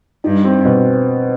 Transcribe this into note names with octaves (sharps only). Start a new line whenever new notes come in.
G2 D#4
C4
B2